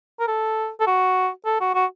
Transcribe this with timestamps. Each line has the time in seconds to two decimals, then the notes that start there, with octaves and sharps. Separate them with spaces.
0.20 A#4
0.27 A4
0.80 A4
0.87 F#4
1.45 A4
1.60 F#4
1.75 F#4